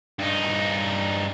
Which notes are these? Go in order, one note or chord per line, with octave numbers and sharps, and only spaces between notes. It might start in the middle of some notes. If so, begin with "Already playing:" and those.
G2 D#4